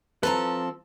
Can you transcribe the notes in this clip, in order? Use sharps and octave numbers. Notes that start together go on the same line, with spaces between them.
F3 C4 A4 B4 A#5